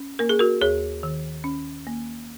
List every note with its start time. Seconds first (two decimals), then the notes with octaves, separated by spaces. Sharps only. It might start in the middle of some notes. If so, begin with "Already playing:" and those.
Already playing: C#4
0.19 A#3 A#4
0.29 G#4
0.39 F#4 A#4
0.61 D#2 G#4 C#5
1.03 D#3
1.44 C#4
1.87 A#3